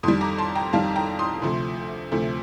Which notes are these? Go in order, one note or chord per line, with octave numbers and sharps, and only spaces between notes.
F2 D#3 G3 C6 D#6
A#5 D6
A5 C6
G5 A#5
F2 D#3 G3 F5 A5
G5 A#5
C6 D#6
D2 C3 F3 A3
D2 C3 F3 A3